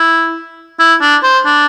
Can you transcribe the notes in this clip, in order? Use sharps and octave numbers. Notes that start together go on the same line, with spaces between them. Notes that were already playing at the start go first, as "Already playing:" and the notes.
Already playing: E4
E4
D4
C5
D4